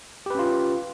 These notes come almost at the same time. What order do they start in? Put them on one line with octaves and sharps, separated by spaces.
G4 B4 C#4 F4